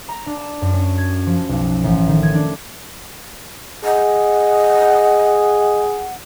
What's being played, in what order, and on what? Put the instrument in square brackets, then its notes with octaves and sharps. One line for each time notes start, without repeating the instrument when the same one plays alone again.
[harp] A#5
D4
A5
F#2
C#4
G#6
F3
B1
A1
D#3
G#6
D4
[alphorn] G#4 [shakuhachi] D#5 [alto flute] F#5